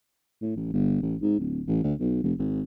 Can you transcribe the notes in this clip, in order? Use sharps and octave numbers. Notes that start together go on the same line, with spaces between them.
A2
A1
G1
A1
G#2
D1
A1
D2
B1
F1
G#1